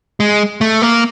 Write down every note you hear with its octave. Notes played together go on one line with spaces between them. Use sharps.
G#3
A3
A#3